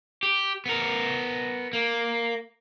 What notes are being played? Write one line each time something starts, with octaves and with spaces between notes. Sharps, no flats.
G4
B3 A#4
A#3